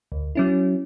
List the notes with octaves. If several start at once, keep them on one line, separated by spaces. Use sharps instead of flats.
D2
F#3 C#4 E4